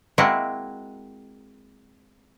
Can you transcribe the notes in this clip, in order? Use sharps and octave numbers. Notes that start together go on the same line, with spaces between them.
G#3 A#3 C4 E4 F#4 D#5